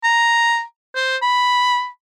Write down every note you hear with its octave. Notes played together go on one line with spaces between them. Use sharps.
A#5
C5
B5